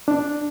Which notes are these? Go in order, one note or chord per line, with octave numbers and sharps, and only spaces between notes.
D4